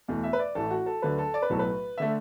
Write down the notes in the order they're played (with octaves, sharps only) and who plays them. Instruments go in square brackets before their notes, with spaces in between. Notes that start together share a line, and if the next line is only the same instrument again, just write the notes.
[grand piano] E2 B2 A3
E5
B4
D5
A1 A2 E3 A3 A4
F#4
A4
D2 D3 F#3 B4
A4
D5
B4
B1 A2 F#3 A3 A4
B4
D3 A3 E5